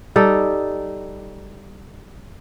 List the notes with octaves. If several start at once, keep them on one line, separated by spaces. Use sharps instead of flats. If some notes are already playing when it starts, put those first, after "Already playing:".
G3 D#4 A4